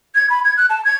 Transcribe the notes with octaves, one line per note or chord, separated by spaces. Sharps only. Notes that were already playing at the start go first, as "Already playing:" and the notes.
G#6
B5
G#6
F#6
A5
G#6